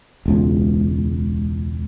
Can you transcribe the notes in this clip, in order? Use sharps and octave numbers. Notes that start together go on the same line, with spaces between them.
E1 C#2